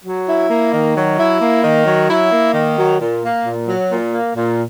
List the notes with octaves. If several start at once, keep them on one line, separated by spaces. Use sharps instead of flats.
F#3
E4
A#3
D#3
F#3
E4
A#3
D#3
F#3
E4
A#3
D#3
F#3
A#2
A#3
A#2
F#3
A#2
A#3
A#2